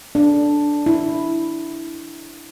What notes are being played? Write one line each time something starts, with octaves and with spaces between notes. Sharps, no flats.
D4
E4